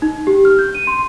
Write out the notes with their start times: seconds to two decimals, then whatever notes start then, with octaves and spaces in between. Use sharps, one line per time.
0.02 D#4
0.27 G4
0.45 F6
0.59 G6
0.75 D#7
0.87 C6